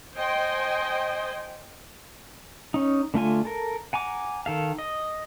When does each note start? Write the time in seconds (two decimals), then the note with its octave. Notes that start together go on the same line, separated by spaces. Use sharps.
0.16 C5 D#5 G5 G#5
2.74 C#4 D#4
3.14 D3 A3 F4 G#5
3.45 A4 A#4
3.93 F#5 G#5 A#5 D6
4.46 D#3 A4 F5
4.79 D#5